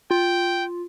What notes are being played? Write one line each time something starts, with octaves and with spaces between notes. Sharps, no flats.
F4 G5